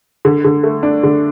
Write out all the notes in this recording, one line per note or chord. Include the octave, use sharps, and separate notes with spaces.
D3
D3
A3
D4
D3